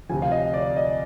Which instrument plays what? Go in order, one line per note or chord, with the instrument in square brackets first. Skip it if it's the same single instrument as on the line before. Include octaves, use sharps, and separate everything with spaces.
[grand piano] D2 C3 F3 G#5
F5
D#5
D5
D#5